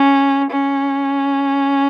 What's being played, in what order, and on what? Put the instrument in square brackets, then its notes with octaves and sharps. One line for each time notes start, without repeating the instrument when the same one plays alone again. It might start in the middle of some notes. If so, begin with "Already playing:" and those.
Already playing: [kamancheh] C#4
C#4